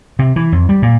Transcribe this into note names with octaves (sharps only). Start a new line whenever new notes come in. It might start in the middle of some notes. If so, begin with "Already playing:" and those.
C3
E3
F2
G3
A#2